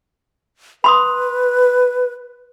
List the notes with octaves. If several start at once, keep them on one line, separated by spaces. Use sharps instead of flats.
B4 B5 C6 D#6